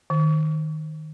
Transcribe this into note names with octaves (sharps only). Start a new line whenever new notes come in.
D#3